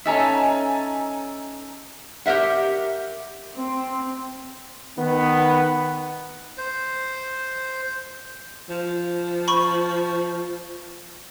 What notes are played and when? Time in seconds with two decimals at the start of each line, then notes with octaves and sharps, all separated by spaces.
0.06 C#4 D#4 A4 E5 G#5 A#5
2.26 G4 A4 A#4 E5 F#5
3.55 C4
4.97 D#3 B3
6.58 C5
8.70 F3
9.48 B5 C#6